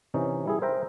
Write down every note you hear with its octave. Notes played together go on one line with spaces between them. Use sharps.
C3 E3 C#4 D#4
G3 E4 G#4
A#4 C5 E5 G5 A#5